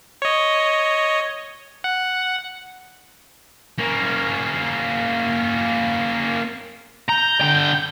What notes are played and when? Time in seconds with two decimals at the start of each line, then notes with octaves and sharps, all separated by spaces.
0.22 C#5 D#5
1.84 F#5
3.78 A#3 C#4
7.09 A#5 G6
7.42 D3 G5